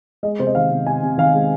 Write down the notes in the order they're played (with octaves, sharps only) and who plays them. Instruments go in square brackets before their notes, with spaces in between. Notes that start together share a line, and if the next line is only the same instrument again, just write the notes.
[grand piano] G#3 D#5
C3 C5
D#5
D#3 F5
C3
C3 G#5
C3
D#3 F5
G#3